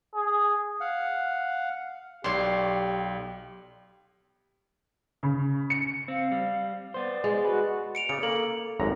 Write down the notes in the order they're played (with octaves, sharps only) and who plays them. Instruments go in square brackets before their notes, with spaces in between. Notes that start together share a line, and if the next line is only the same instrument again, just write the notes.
[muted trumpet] G#4
[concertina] F5 F#5
[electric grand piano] B1 [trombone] G4 [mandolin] C#5 D5 [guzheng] C6
[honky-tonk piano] C#3
C#7
[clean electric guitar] C4 [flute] F5
[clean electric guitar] G3
[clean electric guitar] B3 C5 [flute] D5
[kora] G#3
[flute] F#4 [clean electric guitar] B4
[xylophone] C#7 D7 F7
[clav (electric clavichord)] C#3 D5 [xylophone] C#7
[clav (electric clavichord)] A#3 [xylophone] A4
[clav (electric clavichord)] G#1 F#2 A#5